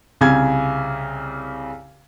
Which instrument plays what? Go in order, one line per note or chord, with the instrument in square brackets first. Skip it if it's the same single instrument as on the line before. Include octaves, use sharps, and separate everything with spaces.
[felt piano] C2 C#3 G#5 G#6